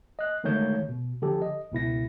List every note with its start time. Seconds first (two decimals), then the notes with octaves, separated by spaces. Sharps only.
0.19 D#5 F#6
0.44 D3 D#3 G#3 A3 C#5 G6
0.89 B2
1.22 D3 F3 G4 A4
1.42 D#5
1.72 C#2 B2 E4 A#6